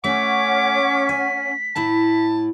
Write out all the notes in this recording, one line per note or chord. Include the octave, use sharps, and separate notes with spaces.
A3 C#4 C#5 F#5 D6 B6
G#5
A2 E4 A5